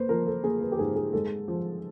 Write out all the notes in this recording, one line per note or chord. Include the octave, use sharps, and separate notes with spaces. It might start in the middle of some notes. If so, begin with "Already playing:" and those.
Already playing: A#3 B4 C5
F3 A#4
A4
A#3 G#4
B4
G4
G#2 G#4
G#4
G#3 A4
F3